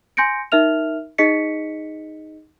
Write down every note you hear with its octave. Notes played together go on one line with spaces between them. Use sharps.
G#5 C6 G6 A#6 C#7 D7
D#4 A#4 E5 F6 F7
D#4 G#4 D#5 B6 C#7